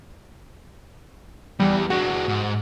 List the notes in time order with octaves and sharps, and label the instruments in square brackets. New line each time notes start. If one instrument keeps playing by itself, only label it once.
[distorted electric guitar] E2 [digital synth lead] G3
[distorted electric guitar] G#3 D4 [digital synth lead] F#4
[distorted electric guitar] G#2